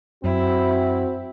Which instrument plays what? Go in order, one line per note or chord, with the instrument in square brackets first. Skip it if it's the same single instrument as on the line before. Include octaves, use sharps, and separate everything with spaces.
[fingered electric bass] F#2 [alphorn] C4 [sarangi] E4 [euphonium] F#4